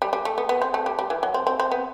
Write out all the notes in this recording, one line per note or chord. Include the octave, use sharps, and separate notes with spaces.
G3
G3
A3
B3
B3
C4
A3
G3
G3
E3
F#3
C4
C4
C4
B3